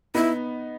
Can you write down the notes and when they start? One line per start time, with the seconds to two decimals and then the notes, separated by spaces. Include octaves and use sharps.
0.15 B3 D#4 E4